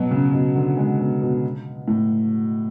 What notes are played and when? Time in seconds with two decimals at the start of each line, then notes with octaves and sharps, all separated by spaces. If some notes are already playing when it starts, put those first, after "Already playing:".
Already playing: B2 F#3
0.11 C#3
0.33 B2
0.55 D3
0.77 G#3
0.99 B2
1.22 B2
1.88 A2